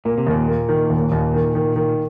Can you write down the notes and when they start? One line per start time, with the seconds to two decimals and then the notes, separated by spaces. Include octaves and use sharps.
0.05 A#2 A#3
0.18 C3
0.27 D#2 A#2
0.48 A#3
0.69 D#3
0.90 D#2
1.12 D#2
1.34 D#3
1.55 D#3
1.76 D#3